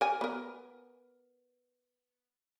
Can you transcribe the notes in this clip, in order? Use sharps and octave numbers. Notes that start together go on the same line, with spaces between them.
A#4 G#5
B3 A#4